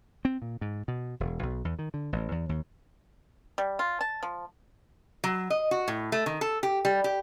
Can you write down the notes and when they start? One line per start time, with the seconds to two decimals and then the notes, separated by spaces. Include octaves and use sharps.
0.25 C4
0.42 A#2
0.61 G#2
0.88 B2
1.20 E1
1.43 B1
1.65 E2
1.79 D#3
1.94 D3
2.13 A1
2.31 E2
2.49 D#2
3.58 G3
3.79 F4
4.01 A5
4.23 F3
5.24 F#3
5.50 D#5
5.71 F#4
5.88 A2
6.12 A3
6.26 D#3
6.41 A4
6.63 G4
6.85 G3
7.04 G4